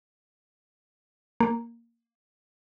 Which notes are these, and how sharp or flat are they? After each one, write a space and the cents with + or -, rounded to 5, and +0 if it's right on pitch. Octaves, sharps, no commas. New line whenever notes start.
A#3 +0